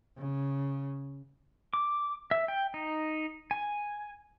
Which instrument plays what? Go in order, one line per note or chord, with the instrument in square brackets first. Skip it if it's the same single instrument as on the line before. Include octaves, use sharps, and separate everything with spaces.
[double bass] C#3
[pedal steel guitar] D6
E5
G5
D#4
G#5